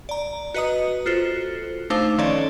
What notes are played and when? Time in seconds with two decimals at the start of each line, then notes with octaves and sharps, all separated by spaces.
0.09 D5 A#5
0.54 F#4 B4 D#5 A#5 D#6
1.06 F4 F#4 A4 C5
1.90 A3 D4 D#4 C5 F5
2.18 D#3 F3 C#4 A4 C#5 D5